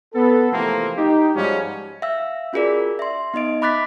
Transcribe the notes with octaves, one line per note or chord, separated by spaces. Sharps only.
B3 A4
C3 E3 F3 A3 A#3 C4
D#4 G4
G#2 F3 G3 G#3 C#4 F#4
E5 F5 G5 E6
C#4 F4 F#4 G#4 A#4 D5
E5 C6
B3 D#4 D#5 D7
E5 B5 D6 F#6 A6 B6